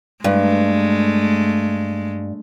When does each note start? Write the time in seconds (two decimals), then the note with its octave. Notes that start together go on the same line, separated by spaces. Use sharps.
0.24 G2 G#3 A3